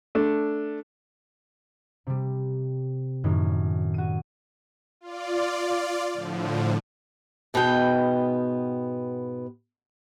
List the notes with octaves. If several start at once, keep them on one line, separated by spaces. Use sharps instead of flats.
A3 D4
C3 G3
F#2 A2 D#3 A3 D#4
F#4 D#7
F4 D5
A2 D3 F3
G#2 B2 B3 D#5 G5